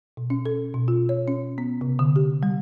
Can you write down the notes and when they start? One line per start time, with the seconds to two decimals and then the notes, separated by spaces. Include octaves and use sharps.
0.17 B2
0.30 C#4
0.46 A4
0.74 B2
0.88 F4
1.09 C#5
1.28 C#4
1.58 B3
1.81 C3
1.99 D3
2.16 G4
2.43 G3